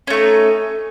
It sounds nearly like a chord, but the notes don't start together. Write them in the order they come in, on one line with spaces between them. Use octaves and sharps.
C#4 A3 D#4